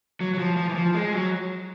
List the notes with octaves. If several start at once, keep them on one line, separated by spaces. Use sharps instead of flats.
F#3
F#3
F3
F3
E3
F3
G#3
F#3